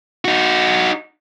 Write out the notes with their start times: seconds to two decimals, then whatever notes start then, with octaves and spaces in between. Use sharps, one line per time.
0.25 D#4 F#4